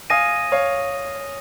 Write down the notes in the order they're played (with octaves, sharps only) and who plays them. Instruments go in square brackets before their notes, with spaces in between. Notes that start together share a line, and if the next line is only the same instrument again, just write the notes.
[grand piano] F5 G#5 [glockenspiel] D#6 A#6 D#7
[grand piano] C#5 F5